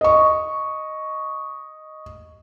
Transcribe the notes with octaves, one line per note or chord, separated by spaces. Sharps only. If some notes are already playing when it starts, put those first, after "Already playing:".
D#5 C#6